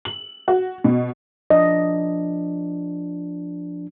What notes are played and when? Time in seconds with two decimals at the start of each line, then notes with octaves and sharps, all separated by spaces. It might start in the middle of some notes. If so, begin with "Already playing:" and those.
0.05 F#7
0.48 F#4
0.84 B2
1.50 F3 D4 D#5